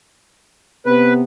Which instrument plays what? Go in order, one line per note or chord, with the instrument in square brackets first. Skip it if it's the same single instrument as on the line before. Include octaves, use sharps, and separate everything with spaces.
[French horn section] C3 B3 [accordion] B4